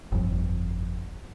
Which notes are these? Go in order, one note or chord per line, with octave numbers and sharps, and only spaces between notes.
G1 F2